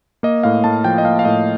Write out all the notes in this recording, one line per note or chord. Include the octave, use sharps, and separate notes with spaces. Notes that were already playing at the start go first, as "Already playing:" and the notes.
A#3 D#5
A2 F5
A2 A5
F3 G5
D#5
A#3 F5
F5
A2 D#5